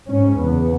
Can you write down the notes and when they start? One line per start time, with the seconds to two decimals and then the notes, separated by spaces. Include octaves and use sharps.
0.09 G#2 C#4
0.38 E2 C#3 B3